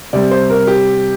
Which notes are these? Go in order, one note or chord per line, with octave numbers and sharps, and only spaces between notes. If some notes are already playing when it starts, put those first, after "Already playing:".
C3 G3 C4 D5
C5
A#4
G4